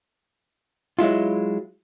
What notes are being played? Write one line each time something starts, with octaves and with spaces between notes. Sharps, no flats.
F#3 G#3 E4 F4